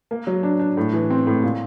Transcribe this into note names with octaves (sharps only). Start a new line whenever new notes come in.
A#3
F#3
D4
D4
A2
E3
C4
A2
A#2